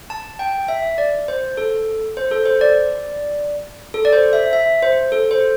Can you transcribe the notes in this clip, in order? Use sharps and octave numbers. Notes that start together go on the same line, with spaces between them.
A5
G5
E5
D5
C5
A4
C5
A4
C5
D5
A4
D5
C5
E5
E5
C5
A4
C5